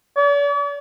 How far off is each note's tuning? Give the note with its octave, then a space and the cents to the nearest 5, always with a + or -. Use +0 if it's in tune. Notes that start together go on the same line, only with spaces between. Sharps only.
D5 -45